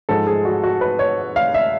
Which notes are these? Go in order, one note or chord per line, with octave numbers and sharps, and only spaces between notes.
G#2 F3 G#3 A4
G#4
F#4
F#4
B4
C#5
F5
E5